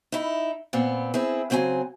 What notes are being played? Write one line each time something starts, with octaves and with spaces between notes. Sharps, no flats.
D#4 E4
A#2 B3 C4
C4 E4 G#4
C#3 F#3 C4 D#5 G#5